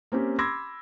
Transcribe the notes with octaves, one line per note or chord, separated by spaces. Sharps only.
A#3 C4 C#4 G4
B5 C6 D6 E6 G#6 A#6